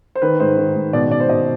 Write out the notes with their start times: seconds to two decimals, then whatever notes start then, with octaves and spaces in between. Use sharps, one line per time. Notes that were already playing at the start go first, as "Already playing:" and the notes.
0.15 C5
0.22 D#3 B4
0.40 G#2 C5
0.57 D#3
0.75 G#2
0.93 B2 D5
1.10 B2 D5
1.20 C5
1.29 B2 D#5